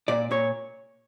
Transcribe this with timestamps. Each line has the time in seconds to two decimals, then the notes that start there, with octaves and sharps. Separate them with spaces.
0.08 A#2 D5
0.31 A#2 C#5